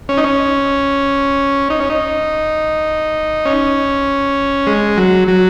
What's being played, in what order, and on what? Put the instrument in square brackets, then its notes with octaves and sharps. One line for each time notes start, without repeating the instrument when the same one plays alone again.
[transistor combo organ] C#4
D#4
C#4
D#4
C#4
D#4
C#4
G#3
F#3
F#3